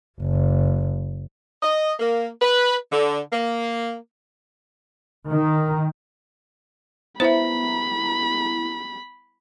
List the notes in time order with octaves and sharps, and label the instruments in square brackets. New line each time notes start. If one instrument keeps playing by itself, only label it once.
[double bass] F#1
[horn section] D#5
A#3
B4
D3
A#3
[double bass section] D#3
[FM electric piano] B3 E4 A#5 [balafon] C5 E5 [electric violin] B5